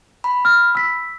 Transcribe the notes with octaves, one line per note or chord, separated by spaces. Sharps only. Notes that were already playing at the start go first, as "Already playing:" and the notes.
B5
F6
E6 B6